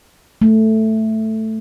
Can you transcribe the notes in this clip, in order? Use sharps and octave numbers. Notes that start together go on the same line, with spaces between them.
A3